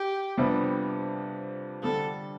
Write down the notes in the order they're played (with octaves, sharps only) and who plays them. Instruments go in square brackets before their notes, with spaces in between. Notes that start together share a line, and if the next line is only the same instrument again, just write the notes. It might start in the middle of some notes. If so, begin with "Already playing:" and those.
Already playing: [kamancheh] G4
[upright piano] F2 C3 G3 B3 D4
[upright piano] D3 G3 D4 [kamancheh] A4